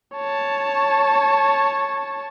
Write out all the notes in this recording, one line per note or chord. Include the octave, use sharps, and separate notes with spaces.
C#5 A5